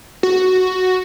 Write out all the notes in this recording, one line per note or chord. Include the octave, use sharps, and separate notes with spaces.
F#4